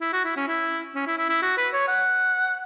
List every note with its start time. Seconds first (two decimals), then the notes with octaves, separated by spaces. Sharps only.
0.01 E4
0.13 F#4
0.25 E4
0.36 C#4
0.48 E4
0.95 C#4
1.07 E4
1.18 E4
1.29 E4
1.42 F#4
1.57 B4
1.73 C#5
1.88 F#5